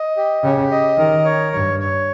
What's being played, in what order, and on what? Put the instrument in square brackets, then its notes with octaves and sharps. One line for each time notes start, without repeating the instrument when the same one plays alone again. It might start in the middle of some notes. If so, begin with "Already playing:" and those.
Already playing: [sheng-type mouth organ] D#5
G4
[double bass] C#3 [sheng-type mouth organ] G4
[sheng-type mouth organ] D#5
[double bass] D#3 [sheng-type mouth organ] A#4
[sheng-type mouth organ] C#5
[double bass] G2 [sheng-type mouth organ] C#5
[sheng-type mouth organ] C#5